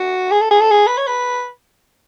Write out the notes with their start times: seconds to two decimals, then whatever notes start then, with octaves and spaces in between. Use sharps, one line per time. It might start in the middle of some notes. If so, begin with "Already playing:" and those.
Already playing: F#4
0.31 G#4
0.41 A4
0.51 G#4
0.61 A4
0.71 G#4
0.87 B4
0.97 C#5
1.07 B4